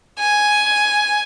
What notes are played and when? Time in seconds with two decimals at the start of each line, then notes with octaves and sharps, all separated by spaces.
0.19 G#5